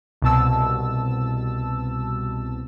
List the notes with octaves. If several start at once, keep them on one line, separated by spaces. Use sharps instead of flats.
C2 B2 A5 E6